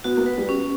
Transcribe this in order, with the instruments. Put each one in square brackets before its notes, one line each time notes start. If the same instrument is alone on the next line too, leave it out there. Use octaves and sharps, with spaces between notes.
[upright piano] B3 [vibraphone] F#4
[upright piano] A#3
[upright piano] B3 [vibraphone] B4
[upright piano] G3
[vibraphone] C#4